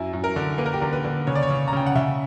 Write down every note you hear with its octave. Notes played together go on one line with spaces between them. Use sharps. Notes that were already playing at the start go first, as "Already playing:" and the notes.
Already playing: F#2 E4
F#2
A#4
D3
A#3 B4
A#4
G4
D3 A#4
B4
D3
C#3 C#5
D5
C#5
C#3
A#5
C#3 G5
F#5
C#3 E5